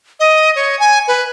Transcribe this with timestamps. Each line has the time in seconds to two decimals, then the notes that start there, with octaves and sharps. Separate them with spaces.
0.20 D#5
0.56 C#5
0.79 G#5
1.08 B4